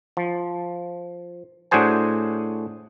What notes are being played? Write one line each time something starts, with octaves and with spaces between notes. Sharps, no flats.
F3
A2 D4 F#4 G#4 C5 G#5